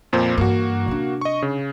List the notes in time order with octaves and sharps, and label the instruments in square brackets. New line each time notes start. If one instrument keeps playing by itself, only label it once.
[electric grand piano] F2 A#2 C5
[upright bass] G2 E3 [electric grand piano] A#3 F#4
[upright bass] C3 D4
[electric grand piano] D#5 C#6
C#3